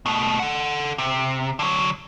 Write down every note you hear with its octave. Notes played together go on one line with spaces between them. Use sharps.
B2 A3
A4 F#5
C3
D3 F#3